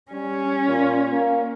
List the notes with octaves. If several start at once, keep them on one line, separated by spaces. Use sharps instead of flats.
G3 C#4
A#2
A#3